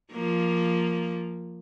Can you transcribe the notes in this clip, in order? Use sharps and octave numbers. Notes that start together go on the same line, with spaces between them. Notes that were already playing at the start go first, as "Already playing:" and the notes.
F3 A#3